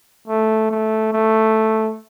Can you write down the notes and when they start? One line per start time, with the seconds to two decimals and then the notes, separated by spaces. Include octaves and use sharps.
0.28 A3
0.71 A3
1.13 A3